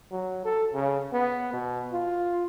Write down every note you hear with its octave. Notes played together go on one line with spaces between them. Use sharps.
F#3
A4
C#3
B3
B2
F4